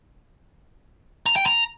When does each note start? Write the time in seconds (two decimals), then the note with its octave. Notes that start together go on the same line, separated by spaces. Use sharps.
1.26 A#5
1.36 G5
1.46 A#5